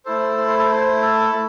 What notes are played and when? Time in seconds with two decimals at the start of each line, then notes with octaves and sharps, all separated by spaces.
0.05 A3 E4 A4 C5
0.38 C5
0.48 C5
0.58 A4
0.70 C5
1.02 A4
1.34 A3